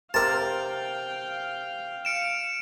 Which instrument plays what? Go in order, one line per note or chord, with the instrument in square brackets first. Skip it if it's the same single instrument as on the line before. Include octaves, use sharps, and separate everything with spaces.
[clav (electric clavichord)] C3 [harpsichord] A#4 A5 [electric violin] F5 G5
[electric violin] F5 [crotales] C#7 D7 E7